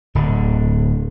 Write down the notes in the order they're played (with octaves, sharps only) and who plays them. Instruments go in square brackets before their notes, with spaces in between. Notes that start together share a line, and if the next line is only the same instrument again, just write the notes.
[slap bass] D1 D3